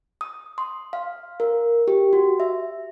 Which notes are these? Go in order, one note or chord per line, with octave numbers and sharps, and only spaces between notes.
D#6
C6
F5
A#4
G4
F#4
E5